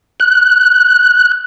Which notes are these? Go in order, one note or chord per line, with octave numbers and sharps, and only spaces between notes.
F#6